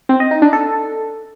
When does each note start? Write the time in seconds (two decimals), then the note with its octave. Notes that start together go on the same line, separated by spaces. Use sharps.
0.09 C4
0.20 D#5
0.31 D#4
0.42 D4
0.53 A4